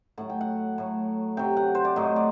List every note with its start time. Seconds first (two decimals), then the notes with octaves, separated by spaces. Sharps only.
0.18 A2 F#3 F#5
0.30 G5
0.41 F#5
0.78 A2 F#3
1.37 C3 F#3 G5
1.57 F#5
1.75 C5
1.85 D5
1.96 A2 F#3 D#5
2.16 D5